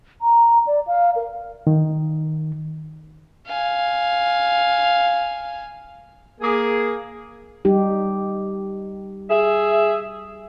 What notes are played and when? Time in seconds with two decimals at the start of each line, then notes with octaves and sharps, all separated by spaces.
0.22 A#5
0.67 D5
0.87 F5
1.16 A#4
1.67 D#3
3.47 F5 G#5
6.41 A#3 G#4
7.65 G3 D#4 G4
9.30 G#4 E5